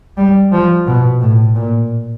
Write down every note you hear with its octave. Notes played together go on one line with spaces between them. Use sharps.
G3
F3
B2
A2
A#2